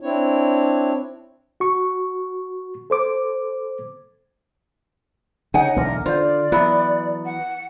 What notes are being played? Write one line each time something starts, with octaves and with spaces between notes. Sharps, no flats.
C4 D4 E4 C#5
F#4 C#6
A4 C5 D6
C#3 D#4 F#5 G#5
B1 E2 D3 A#4
D3 F4 C5
D5
E3 F#3 B3
F#5